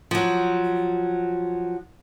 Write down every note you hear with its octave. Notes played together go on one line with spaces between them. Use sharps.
F3 F#3